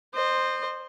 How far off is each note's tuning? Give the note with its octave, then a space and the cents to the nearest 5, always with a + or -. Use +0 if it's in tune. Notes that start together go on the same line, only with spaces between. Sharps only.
C5 +0 D#5 -35